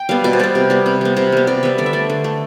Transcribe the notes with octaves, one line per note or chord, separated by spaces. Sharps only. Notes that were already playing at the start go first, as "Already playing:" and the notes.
Already playing: G5
G3 B3 F5
B2 D5
C5
G3 B3 D5
C3
G3 B3
C3
G3 B3
C3 C5
G3 B3
C3 D5
G3 B3 E5
D3 D5
E5
A3 D5
D3
A3